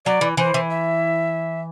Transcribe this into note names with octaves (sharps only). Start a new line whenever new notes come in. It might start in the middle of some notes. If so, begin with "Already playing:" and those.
F#3 D5
E3
E3 C5
E3
E5